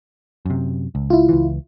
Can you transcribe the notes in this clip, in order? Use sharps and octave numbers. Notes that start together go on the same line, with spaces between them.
F#2 C3
C#2
E4 F4
C#2 E3